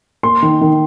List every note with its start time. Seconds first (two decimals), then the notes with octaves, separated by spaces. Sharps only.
0.23 A#3 C6
0.43 D#3
0.61 D#3